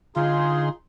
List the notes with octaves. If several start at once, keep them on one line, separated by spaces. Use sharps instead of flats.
D3 D#4 F4 G#4 C6